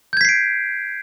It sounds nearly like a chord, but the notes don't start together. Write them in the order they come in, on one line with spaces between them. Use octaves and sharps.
G6 G#6 B6 C7 D7